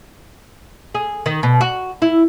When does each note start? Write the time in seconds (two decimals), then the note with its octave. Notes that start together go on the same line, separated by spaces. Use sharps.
0.95 G#4
1.26 D#3
1.43 B2
1.61 F#4
2.02 E4